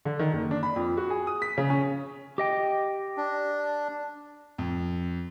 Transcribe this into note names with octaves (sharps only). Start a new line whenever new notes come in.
D3
D#3
F#1
D4
B5
F2
F#4
G#4
D#6
B6
C#3
C#4
G4 D#5 G5
D4
F2